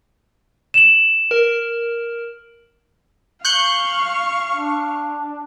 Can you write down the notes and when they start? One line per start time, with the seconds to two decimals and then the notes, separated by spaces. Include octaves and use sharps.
0.74 E7 F#7
1.31 A#4
3.45 F5 C#6 F#6 G6 C#7
4.51 D4